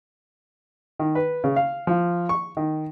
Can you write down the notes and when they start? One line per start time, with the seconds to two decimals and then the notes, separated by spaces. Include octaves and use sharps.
1.00 D#3
1.15 B4
1.44 C#3
1.56 F5
1.87 F3
2.29 C#6
2.57 D#3